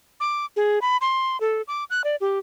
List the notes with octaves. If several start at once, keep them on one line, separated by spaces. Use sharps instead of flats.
D6
G#4
B5
C6
A4
D6
F#6
D5
G4